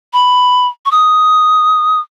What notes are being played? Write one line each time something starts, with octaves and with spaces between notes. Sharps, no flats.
B5
C#6
D#6